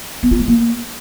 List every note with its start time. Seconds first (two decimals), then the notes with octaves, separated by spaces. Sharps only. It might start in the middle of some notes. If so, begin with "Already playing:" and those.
0.23 B3
0.31 F4
0.40 A3
0.48 A#3